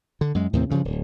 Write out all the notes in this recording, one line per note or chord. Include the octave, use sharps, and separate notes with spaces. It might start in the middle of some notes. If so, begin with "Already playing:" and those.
D3
F#2 G#3
D#2 A2 C3 C4
G2 C#3 E3 F3
D1